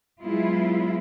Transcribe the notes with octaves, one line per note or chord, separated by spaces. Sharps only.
F#3 G#3 B3 E4 F4